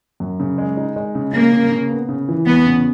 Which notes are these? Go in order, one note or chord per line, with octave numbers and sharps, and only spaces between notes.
F#2
C#3
G#3
D#4
G#3
C#3
C#3 A#3
C#3
C#3
B3
C#3
E3
E2 B3
C#3